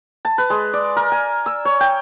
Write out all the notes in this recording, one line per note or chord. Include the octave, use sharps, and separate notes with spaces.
A5
B4
G#3
D5
A#4
G#5
E6
C#5
G5